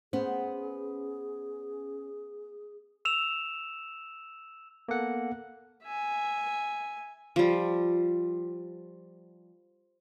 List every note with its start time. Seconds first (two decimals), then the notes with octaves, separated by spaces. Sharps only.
0.13 B3 C#4 G#4 C5
3.05 E6 E7 F7
4.88 A#3 B3 A4 F#5
5.83 E5 G#5
7.36 F3 G3